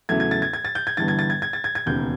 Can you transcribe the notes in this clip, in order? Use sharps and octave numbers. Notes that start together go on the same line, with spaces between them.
E2 C#3 F#3 A3 G#6
G#6
A6
G#6
G#6
A6
G6
G#6
G1 G2 E3 A6
G#6
A6
G#6
G#6
A6
G#6
G#6
E1 D#2 C#3 G6